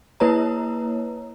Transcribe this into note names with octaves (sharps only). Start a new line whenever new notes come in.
A#3 E4 B4 C#5 A#5